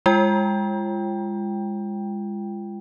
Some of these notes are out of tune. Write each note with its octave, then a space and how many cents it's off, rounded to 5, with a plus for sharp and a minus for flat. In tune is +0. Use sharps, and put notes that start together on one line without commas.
G#3 -25 F4 -30 G5 +0